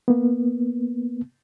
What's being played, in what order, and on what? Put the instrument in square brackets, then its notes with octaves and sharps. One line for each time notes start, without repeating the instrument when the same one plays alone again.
[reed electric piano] A#3 B3